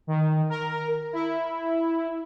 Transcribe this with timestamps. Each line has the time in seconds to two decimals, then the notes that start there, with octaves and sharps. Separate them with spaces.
0.07 D#3
0.49 A#4
1.13 E4